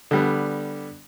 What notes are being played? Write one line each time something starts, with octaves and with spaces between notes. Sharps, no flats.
D3 G3 B3